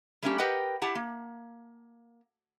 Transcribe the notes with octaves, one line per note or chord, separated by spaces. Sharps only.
G3 A3 A#3 C#4 D4 G4
G4 A#4 B4 D#5 F#5 G5
E4 G4 F#5 A5
A#3